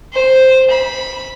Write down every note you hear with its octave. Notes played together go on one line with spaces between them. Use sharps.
C5
B5